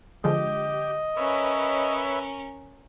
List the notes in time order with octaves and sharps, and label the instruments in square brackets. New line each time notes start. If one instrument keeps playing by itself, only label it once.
[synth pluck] D3 F3 G#3 [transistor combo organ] G4 [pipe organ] D#5
[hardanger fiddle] C#4 A#4 [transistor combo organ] B4 C#5 E5